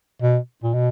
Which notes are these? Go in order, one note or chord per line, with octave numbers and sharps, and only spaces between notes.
B2
A#2
B2